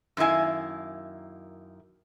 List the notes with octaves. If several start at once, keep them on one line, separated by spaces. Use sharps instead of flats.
F#2 D#3 A#3 E4 G#5